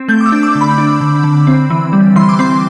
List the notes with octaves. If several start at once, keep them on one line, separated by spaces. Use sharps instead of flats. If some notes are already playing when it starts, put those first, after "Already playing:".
Already playing: C4
A3 G6
D6
E6
D4
D6
D3
B5
D4
D3
D3
C4
E3
G3
E3 C6
D6
C4 C6